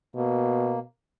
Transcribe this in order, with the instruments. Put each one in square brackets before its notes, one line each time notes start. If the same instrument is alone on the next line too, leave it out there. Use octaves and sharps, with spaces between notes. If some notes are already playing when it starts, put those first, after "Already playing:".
[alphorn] B2 [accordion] A#3